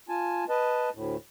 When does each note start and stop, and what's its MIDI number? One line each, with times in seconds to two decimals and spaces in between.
0.09 0.44 65
0.09 0.44 80
0.09 0.44 81
0.49 0.89 71
0.49 0.89 75
0.49 0.89 81
0.95 1.16 38
0.95 1.16 45